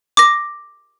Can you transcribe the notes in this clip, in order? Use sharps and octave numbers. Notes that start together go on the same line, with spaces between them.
D6 A#6